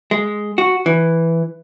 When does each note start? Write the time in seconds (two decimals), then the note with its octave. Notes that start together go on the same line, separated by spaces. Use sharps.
0.11 G#3
0.58 F#4
0.86 E3